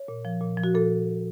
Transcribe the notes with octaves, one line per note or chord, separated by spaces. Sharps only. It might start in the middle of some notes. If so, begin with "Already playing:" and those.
Already playing: C#5
A#2
F3
A#2
F3
F#4
A#2 A4